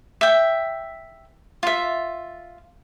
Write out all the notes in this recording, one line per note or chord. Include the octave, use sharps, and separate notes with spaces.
E5 G5
F4 E5